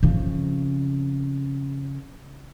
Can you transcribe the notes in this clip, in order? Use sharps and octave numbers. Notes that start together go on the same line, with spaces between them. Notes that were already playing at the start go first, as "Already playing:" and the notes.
F2 C#3